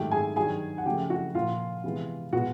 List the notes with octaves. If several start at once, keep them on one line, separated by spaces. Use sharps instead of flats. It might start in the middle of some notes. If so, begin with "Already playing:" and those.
Already playing: G#2 D#3 F#3 A3 G4 G5
G#4 G#5
G2 D#3 F#3 G#4 G#5
F#5
C#3 F3 A3 G4 G5
F#4 F#5
A#2 F3 A#3 F4 F5
C3 E3 G#3 B3
B2 G#3 B3 F#4 F#5